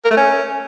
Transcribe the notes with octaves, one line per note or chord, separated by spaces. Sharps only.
A#4
A3
C#4